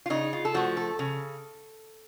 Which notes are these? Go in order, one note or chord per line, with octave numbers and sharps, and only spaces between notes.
F4
C#3 D#4
F4
A4
F3 A3 F#4
A4
C#3